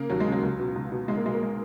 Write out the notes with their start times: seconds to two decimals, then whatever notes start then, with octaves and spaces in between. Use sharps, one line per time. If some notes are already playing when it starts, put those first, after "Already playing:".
Already playing: C#3 A#3
0.10 D#2 F#3
0.20 G#3
0.26 C#3
0.32 F#3
0.43 C#2
0.59 B2
0.76 C#2
0.92 B2
1.08 B1 G#3
1.17 A#3
1.24 B2 G#3
1.34 A#3
1.43 G#3